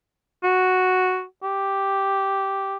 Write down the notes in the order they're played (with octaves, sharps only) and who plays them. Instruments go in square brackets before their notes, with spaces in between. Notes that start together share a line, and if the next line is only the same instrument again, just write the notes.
[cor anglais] F#4
G4